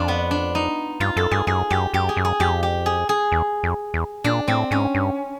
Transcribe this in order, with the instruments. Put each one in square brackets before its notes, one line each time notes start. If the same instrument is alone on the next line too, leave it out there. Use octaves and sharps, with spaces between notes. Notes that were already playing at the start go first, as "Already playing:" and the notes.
Already playing: [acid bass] F2 [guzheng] D4 F4
[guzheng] B3
D4
D#4
[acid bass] G2 [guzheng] F4
[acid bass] F#2 [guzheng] A4
[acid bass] G2 [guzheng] G#4
[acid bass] F#2 [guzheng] G#4
[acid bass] F#2 [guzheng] G4
[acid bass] F#2 [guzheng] G4
[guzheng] G#4
[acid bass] F#2
[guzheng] G#4
[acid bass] F2 [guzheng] G4
[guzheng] G4
G#4
G#4
[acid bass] E2
F2
E2
[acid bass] A#2 [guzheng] D4
[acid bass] A2 [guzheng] C4
[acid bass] G#2 [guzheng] C#4
[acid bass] G2